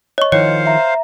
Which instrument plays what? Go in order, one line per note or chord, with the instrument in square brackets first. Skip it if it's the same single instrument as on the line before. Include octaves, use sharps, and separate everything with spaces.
[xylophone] C#5 C#6 [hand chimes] D#5
[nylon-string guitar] D#3 F3 E4 [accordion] C5 F5 [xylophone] C#5 [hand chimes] C#7
[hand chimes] E5 A#5